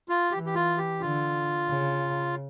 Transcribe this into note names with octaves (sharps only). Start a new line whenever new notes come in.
F4
E3 G4
G4
F4
G4
D3 F4
C#3